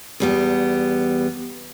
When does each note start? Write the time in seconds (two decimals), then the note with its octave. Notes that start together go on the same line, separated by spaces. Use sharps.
0.20 E2 G3 B3